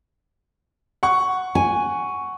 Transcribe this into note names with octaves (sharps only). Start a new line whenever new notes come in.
F#5 C#6
G#5